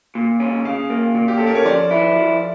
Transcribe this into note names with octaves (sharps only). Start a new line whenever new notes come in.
A#2
C#4
C#3 F5
A#3
A#2
G4
C#4 A4
A#4
C#5
F3 D5
E4
F3